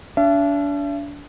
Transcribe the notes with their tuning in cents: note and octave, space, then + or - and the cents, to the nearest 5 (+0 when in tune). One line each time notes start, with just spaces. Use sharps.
D4 -30 E5 +40